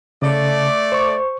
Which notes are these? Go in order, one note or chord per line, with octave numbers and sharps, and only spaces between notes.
C#3 A3 D5
C5 C#6